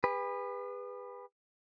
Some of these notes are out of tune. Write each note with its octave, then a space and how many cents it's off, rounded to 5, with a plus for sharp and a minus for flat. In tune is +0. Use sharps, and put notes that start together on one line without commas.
G#4 -45 B4 +0